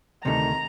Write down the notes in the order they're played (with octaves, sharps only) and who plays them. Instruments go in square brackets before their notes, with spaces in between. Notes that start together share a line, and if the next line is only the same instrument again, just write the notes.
[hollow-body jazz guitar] D2 C3 D#3 A3 [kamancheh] A#5